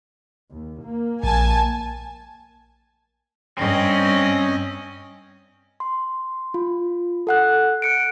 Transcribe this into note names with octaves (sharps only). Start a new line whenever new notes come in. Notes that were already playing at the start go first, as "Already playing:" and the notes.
D#2
A#3
A#1 G#5 A5
G2 C4 C#4 D#5
C6
F4
A4 F#5 F#6
F#6 C#7 D7